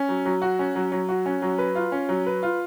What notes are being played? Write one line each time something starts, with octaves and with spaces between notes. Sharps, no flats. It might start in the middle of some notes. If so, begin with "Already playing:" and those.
Already playing: C#4
F#3
F#3
F#4
C#4
F#3
F#3
F#4
C#4
F#3
B4
F4
C#4
F#3
B4
F4